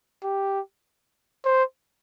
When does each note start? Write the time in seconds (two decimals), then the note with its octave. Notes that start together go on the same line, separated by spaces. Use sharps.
0.24 G4
1.45 C5